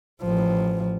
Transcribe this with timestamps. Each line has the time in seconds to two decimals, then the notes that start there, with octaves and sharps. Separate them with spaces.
0.22 A1 F3